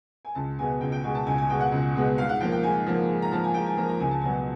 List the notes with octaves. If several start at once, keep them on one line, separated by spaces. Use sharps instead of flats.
G#5
C#2 A5
B2 G#3 B3 G#5
C#2 G5
G5
B2 G#3 B3 G#5
A5
C#2 G#5
G#5
B2 G#3 B3 G5
F#5
C#2
B2 G#3 B3
G#2 F5
F#5
F3 A#3 G5
G5
G#2 G#5
F3 A#3
G#2
A#5
F3 A#3 A5
G#5
G#2 G5
G#5
F3 A#3 A#5
A#5
C#2 G#5
A5
B2 F#3 B3 G#5